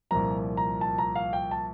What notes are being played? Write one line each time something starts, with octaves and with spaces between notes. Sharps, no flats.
C2 A#2 F3 A#3 A#5
A#5
A5
A#5
F5
G5
A5